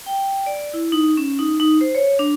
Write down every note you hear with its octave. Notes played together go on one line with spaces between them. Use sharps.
G5
D5
E4
D#4
C#4
D#4
D#4
C5
C#5
D4